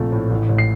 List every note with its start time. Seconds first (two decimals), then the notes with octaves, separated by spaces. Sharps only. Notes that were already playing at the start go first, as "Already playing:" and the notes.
Already playing: A#1 A3 C4
0.12 A2
0.31 A1
0.49 A1
0.58 C7